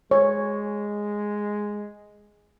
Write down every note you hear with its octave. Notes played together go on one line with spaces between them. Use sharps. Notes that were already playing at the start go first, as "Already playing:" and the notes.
G#3 C#5